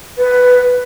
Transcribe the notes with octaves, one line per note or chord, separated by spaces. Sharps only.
B4